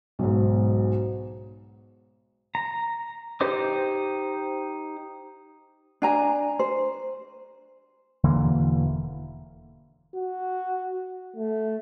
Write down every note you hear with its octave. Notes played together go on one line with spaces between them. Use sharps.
B1 G#2
A#5
D#4 G4 C5 D#5 D6
D4 G#5 A#5
C5
E1 D3 E3 A#3
F#4
A3